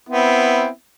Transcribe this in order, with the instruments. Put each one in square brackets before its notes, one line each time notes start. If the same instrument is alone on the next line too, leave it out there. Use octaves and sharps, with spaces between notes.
[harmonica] B3 C4 E4